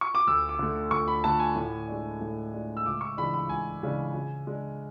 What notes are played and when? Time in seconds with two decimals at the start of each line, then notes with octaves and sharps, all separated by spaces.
0.01 C#6
0.15 D6
0.27 D2 E6
0.49 D6
0.59 D3 A3
0.91 D2 C#6
1.08 B5
1.24 D3 A3 A5
1.39 G#5
1.56 A2
1.88 G#3 D4
2.21 A2
2.54 G#3 D4
2.77 E6
2.85 C#2 D6
3.01 C#6
3.17 C#3 E3 G#3 D4 B5
3.34 B5
3.49 C#2 G#5
3.83 C#3 E3 G#3 D4
4.14 C#3
4.47 G#3 D4